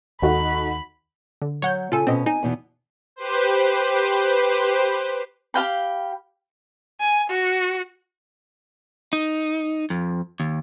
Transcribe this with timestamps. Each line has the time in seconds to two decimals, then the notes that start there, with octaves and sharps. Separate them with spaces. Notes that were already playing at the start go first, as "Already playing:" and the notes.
0.22 D#2 D#4 F#4 A4 B5
1.42 D3
1.62 F#3 C#5 F#5 G6
1.92 C#3 F4 A4 G#5
2.07 B2 C4 C#4 D#5
2.26 D#4 G#5
2.43 E2 B2 E3
3.16 G4 B4 C5
5.54 G4 F5 G5 B5
7.00 G#5
7.30 F#4
9.13 D#4
9.90 F2
10.40 D#2